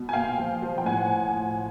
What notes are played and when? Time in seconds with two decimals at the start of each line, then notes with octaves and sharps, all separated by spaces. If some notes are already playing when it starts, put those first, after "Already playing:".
Already playing: B2
0.09 G#5
0.13 A#2 F5 G5
0.38 F3
0.62 F3
0.78 G5
0.86 A2 F#5 G#5